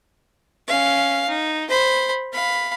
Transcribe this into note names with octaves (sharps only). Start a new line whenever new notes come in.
C#4 F5
D#4
C5 B5
F5 B5